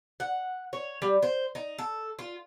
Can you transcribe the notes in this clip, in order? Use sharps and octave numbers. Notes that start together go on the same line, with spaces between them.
F#5
C#5
G3
C5
D#4
A4
F4